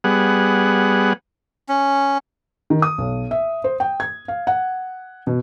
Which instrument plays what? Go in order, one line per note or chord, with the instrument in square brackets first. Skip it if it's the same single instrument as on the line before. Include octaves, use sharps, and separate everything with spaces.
[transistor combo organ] G3 B3 G#4 F#5
[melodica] C#4
[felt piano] D#3
D#6
B1
E5
C5
G5
G#6
F5
F#5
B2